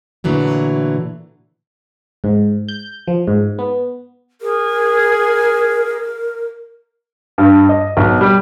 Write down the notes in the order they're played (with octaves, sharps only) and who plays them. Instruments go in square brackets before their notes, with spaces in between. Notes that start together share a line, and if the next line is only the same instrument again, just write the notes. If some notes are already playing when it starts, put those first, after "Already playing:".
[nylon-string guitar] A#2 D3 E3 F#3 A3
[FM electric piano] G#2
G6
F3
G#2
B3
[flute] G#4 [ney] A#4
[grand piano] G2
D#5
B1
G3